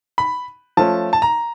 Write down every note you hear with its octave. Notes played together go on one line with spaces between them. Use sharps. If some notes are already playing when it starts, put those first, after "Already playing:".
B5
F3 A3 C#4 A5
A5
A#5